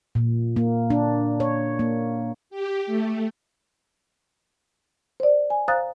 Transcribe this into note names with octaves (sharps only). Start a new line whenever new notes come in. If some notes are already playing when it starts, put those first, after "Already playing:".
A#2
A#3
D4
C#5
A#3
G4
A3
C5 D5
G#5
C5 F5 A#5 D#6 F#6 A6